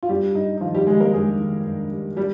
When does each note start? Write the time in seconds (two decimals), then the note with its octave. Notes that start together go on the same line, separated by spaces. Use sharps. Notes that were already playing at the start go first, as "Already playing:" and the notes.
0.03 F4
0.09 G2 G3 G4
0.35 G2 D#4
0.57 D#4
0.61 D#3 F3 F4
0.74 G3 G4
0.87 D#3 G#3 G#4
1.00 A#3 A#4
1.13 G2 G#3 G#4
1.39 D#3
1.65 G2
1.91 G3
2.17 G3 G4